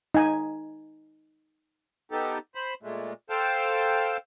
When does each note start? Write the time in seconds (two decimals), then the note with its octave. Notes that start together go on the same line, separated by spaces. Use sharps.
0.15 D#4 G#5
2.12 B3 D#4 G4 A4
2.55 C5 B5
2.83 A#2 G#3 A3
3.30 A4 C5 F5 G5 A5